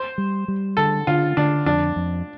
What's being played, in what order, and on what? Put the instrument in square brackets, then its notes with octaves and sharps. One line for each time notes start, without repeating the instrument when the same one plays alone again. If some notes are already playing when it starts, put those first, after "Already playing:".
Already playing: [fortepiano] C5
[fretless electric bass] G3
G3
[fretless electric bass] D3 [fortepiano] A4
[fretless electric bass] D3 [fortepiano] F4
[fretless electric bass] D3 [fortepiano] D4
[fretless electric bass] F2 [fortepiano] D4
[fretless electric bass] F2